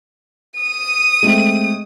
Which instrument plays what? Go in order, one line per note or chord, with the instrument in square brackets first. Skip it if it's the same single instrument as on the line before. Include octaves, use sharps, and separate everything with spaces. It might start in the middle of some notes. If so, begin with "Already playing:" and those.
[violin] D#6 D#7
[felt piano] G#3 A3 C4